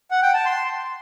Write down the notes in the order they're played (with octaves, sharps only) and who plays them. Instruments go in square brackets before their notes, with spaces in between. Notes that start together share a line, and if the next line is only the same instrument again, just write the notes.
[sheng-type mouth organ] F#5
G5
A5
C6